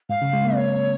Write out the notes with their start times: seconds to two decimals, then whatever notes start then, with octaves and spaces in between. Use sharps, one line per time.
0.09 G#2 F5
0.22 C#3
0.33 G#3
0.45 A#3
0.53 C4
0.57 A#3 C#5